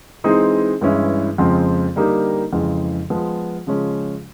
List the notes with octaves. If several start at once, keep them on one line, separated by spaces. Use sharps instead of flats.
E3 G#3 C4 D#4 G#4
G2 E3 G#3 C#4 E4
F2 C#3 F3 G#3 C4
D3 G3 A#3 D#4 G4
F2 C#3 E3 G#3
F3 G#3 B3
C#3 F3 G#3 C#4